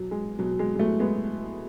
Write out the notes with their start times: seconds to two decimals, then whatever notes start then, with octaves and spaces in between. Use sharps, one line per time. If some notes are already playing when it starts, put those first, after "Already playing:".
Already playing: B2 F#3
0.11 G#3
0.39 B2 F#3
0.59 G#3
0.75 G#3
0.79 F#3 A3
0.99 G#3 B3